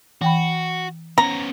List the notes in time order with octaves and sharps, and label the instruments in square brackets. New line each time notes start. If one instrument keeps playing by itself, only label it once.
[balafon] E3 G5 B5 [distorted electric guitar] F#4
[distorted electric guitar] B3 C#4 [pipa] A#5